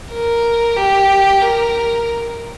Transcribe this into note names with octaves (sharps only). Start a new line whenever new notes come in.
A#4
G4
A#4